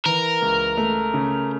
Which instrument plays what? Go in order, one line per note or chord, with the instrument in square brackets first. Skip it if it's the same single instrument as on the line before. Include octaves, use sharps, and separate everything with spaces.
[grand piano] E3 [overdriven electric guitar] A#4
[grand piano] C#2
A3
C#3